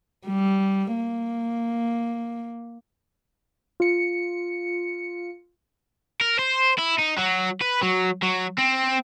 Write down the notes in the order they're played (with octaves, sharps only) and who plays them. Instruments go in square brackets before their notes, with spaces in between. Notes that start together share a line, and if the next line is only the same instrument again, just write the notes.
[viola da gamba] G3
A#3
[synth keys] F4 C#7
[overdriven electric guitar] A#4
C5
E4
D#4
F#3
B4
F#3
F#3
C4